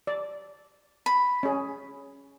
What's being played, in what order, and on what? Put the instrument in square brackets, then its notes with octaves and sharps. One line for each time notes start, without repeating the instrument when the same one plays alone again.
[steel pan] D5
[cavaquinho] B5
[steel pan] C#4 G#4